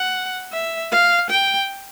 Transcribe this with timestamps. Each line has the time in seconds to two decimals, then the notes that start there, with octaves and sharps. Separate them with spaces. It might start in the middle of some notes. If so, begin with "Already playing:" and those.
Already playing: F#5
0.53 E5
0.92 F5
1.30 G5